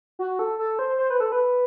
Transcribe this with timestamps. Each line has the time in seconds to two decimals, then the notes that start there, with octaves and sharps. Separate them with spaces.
0.19 F#4
0.39 A4
0.59 A4
0.79 C5
0.98 C5
1.10 B4
1.20 A4
1.32 B4